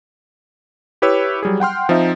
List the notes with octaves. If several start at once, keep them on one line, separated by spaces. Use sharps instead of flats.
E4 G4 B4 C#5 E6
F#3 G3 G#4
F#5 G5 C6 F6
F3 C4 D#4 E5